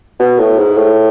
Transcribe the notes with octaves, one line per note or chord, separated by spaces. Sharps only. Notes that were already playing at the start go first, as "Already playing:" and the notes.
B2
A2
G#2
A2